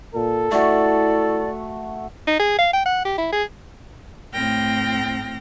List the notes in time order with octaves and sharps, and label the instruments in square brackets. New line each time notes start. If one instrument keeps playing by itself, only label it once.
[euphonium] A#2 [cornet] A4
[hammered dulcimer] A3 F#4 [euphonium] E4 [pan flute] D5
[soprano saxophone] D#4
G#4
F5
G5
F#5
G4
E4
G#4
[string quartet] A2 C4 G5 F6 A#6